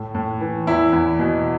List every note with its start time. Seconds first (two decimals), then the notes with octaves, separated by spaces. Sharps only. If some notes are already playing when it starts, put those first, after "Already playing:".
Already playing: A2
0.15 A2
0.41 E3
0.67 E2 E4
0.93 E2
1.19 B2